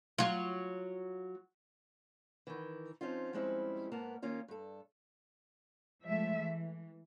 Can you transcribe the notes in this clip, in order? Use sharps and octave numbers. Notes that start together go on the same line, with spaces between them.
F#3 F4
D#3 E3
F3 C4 C#4 D#4 F4
F3 G3 G#3 C4 C#4 E4
G#2 A#3 B3 A#4 A5
D#3 A#3 C#4 F4
G2 A4
F3 G#3 A3 E5
E3